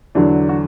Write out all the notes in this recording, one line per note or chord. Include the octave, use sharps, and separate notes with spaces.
E2 D3 F#3 D4
F#4